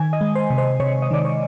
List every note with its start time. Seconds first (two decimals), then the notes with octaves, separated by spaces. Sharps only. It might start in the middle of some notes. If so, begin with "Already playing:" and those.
Already playing: D#3 G#5
0.13 D#5
0.21 G#3
0.35 C5
0.50 C3
0.58 C5
0.80 C3 C#5
1.02 D#5
1.11 D#3 D5
1.25 C#5